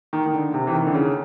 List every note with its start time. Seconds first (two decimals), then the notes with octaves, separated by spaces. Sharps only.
0.13 D#3
0.26 D#3
0.33 D3
0.54 C3
0.67 E3
0.74 D#3
0.86 D3
0.94 C#3